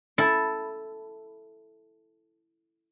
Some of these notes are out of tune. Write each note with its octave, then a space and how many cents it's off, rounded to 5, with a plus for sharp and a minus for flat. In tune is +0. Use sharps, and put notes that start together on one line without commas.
E4 +0 A4 +0